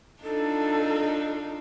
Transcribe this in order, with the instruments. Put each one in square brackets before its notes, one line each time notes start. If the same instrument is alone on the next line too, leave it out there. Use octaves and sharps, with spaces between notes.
[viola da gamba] D4 D#4 F4 [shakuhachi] A4